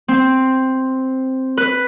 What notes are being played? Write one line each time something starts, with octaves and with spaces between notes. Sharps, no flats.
C4
B4